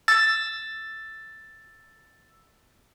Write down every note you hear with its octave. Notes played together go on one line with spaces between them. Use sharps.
E6 A6